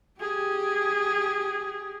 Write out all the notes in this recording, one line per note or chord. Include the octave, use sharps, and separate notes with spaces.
G4 G#4